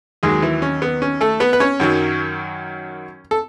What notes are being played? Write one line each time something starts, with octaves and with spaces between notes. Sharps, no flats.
D#2 D#3 F#3 G#3 G#4
E3 E4
C#4
B3
C#4
A3 A4
B3 B4
B4
C#4 C#5
F#2 D#3 F#3
A4